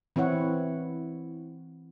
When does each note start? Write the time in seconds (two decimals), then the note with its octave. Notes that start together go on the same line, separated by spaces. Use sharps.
0.16 E3 C4 E4 C#5 F#5